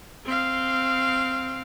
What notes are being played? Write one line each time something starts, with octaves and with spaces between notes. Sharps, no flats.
C4 F5